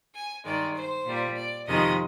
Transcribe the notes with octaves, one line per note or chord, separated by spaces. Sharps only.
G#5
G2 D#3 G#3 D5
C5
A#2 G3
D5
F2 C3 D#3 G#3 D#5